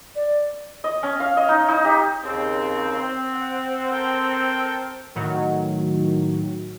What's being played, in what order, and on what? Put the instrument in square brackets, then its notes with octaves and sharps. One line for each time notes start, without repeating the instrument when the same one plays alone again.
[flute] D5
[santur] D#5
C#4
F5
D#5
D#4
D#4
G4
[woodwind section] D#2 C#3 C4
C4
[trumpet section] F#5
A4 A#4 G5
[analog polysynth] A2 D#3 F#3